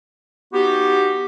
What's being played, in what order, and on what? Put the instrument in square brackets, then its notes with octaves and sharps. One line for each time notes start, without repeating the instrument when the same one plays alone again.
[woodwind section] B3 D#4 F#4 G4